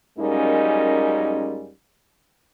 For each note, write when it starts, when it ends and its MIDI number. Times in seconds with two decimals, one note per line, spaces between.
0.19 1.71 42
0.19 1.71 55
0.19 1.71 56
0.19 1.71 58
0.19 1.71 61
0.19 1.71 63